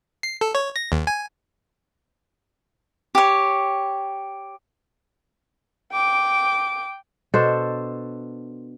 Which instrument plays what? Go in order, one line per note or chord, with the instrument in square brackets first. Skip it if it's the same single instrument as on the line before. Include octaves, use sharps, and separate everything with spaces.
[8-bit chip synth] C7
A4
C#5
A#6
D#2
G#5
[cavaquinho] G4 C#5
[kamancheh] G5 D6
[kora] B2 D4 A4 C5